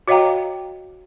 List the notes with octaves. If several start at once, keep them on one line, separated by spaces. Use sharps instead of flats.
F#4 C#5 D#5 F5 G5 A#5